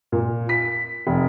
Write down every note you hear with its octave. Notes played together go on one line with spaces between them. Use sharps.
A#2
B6
F1